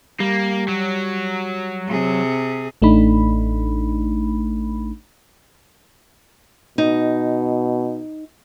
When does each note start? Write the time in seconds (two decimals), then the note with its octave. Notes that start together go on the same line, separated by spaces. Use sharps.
0.20 G3 A#3
0.68 F#3
1.87 C3 G#4
2.82 A1 A3 D4 D#4 B5
6.78 B2 D#4